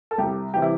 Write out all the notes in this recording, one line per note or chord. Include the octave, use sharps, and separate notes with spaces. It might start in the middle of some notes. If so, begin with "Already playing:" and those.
A4
C2 G4
C3 E3 G3 G4
E4